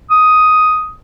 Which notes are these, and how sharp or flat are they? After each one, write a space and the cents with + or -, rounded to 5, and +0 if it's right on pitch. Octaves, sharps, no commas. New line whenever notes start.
D#6 +5